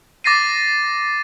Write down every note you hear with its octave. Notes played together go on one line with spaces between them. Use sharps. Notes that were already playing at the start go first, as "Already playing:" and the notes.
D6 A6 A#6 C7 D#7